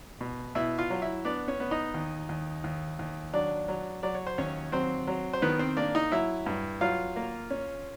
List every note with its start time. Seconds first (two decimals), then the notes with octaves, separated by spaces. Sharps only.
0.21 B2
0.55 B2 E4 E5
0.79 F4 F5
0.90 F#3
1.02 E4 E5
1.25 B3 D4 D5
1.48 C#4 C#5
1.60 B3
1.71 D#4 D#5
1.94 D#2
2.29 D#2
2.64 D#2
2.99 D#2
3.33 F#3 D4 D5
3.68 F#3
4.03 F#3 D5
4.15 C#5
4.27 C5
4.38 D#2 C#4 C#5
4.72 F#3 C4 C5
5.08 F#3
5.33 C5
5.42 D#3 B3 B4
5.59 C4 C5
5.77 A#3 D4 D5
5.95 D#4 D#5
6.12 F#3 E4 E5
6.46 G2
6.81 F#3 F4 F5
7.16 A#3
7.50 C#4